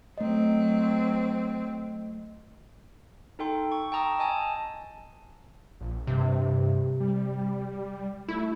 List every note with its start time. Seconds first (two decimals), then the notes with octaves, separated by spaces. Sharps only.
0.18 F#3 A3 C4 D#5
3.39 D#4 A4 G5 C6
3.72 C#6
3.92 G5 A5 A#5 D#6 E6
4.19 D#5 G#5 A5
5.80 A#1
6.07 G2 C3
7.00 G3
8.28 A3 E4